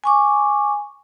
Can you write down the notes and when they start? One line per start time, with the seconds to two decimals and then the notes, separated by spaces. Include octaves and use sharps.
0.04 G#5 C#6 D6